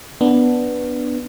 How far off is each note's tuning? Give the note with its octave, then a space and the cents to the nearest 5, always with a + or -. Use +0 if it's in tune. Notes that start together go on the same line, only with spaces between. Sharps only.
B3 +0 D4 +0